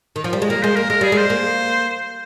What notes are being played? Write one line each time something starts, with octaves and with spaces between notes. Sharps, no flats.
D#3
F3
G3
G#3
A#3 A#4
G#3 C5
A#3 A#4
G#3 A#4
G3 G#4
G#3 C5
A#3